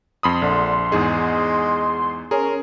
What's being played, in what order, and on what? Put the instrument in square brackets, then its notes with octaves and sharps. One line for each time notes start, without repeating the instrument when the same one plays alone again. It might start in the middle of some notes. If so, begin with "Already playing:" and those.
[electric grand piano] F2 B5 D#6 [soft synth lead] C6
[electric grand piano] A#1 [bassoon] D3
[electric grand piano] E2 G#2 G#4 [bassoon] G#3
[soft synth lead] C#4 [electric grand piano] G#4 [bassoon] A#4